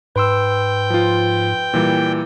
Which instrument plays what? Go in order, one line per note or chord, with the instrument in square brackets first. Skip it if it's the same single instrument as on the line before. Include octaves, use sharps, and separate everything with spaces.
[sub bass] G#2 [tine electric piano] B4 C6 E6 [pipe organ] G5
[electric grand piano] F3 F4
A#2 E3 G3